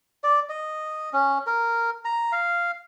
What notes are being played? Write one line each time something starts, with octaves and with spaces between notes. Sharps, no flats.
D5
D#5
C#4
A#4
A#5
F5